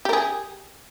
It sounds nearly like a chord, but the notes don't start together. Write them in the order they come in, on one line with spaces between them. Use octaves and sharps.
G4 A#4 G#4